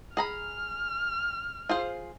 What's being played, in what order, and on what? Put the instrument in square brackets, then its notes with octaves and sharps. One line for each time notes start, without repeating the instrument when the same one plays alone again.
[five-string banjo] G#4 A#5 B5 [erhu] F6
[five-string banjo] F4 G#4 C5